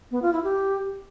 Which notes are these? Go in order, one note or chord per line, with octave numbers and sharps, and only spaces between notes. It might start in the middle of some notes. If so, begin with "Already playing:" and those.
B3
F4
E4
G4